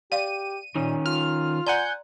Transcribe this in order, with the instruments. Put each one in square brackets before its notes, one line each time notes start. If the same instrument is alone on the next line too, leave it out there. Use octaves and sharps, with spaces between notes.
[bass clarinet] G4 [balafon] D5 F5 [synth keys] D#7
[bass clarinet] A#2 [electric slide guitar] D#3 C#4
[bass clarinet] F4 [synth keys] F6
[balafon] D5 A#5 C6 [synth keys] F#5 G#5 G6